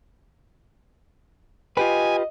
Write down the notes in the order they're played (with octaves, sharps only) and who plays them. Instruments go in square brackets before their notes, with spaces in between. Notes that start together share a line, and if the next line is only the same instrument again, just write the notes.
[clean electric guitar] F4 G4 B4 [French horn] D#5 [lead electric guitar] G#5